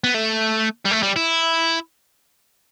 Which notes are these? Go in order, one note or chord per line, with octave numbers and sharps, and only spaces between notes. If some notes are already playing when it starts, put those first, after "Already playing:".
B3
A3
G3
A3
G3
E4